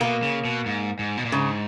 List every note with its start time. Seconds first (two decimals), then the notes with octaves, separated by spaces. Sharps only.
0.01 B2 A#3
0.23 C#3
0.45 B2
0.66 G#2
0.99 G#2
1.17 B2
1.25 A#2
1.32 G#2 C#3